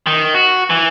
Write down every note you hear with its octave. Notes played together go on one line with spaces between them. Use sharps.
D#3
F#4
E3